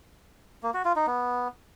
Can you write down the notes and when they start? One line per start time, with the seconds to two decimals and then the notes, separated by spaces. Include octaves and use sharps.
0.63 A#3
0.74 F#4
0.85 F4
0.96 D#4
1.07 B3